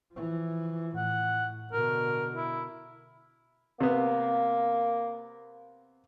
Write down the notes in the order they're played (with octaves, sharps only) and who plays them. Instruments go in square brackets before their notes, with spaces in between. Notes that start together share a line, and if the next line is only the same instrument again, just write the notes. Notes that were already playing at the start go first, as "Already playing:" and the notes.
[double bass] E3 F3
[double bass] A2 [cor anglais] F#5
[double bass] B2 D3 [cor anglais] A#4
[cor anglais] E4
[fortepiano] C3 B3 [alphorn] A#3